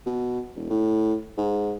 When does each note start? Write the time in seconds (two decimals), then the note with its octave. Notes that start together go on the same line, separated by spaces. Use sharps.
0.06 B2
0.56 E1
0.70 A2
1.38 G#2